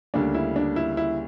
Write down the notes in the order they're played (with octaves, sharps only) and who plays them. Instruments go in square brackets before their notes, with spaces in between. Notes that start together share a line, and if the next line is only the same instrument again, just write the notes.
[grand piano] D2 C#3 G3 A#3 [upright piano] D4
[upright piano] E4
D4
E4
E4